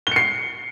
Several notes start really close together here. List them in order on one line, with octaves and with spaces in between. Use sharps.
G7 C#7 C7